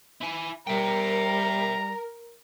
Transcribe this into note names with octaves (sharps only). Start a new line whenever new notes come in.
E4 G#5
G3 A#4 E5 G5 A#5